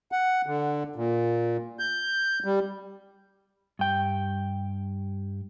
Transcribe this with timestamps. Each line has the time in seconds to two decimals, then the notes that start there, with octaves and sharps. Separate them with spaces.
0.12 F#5
0.46 D3
0.96 A#2
1.79 G6
2.44 G3
3.79 G2 G5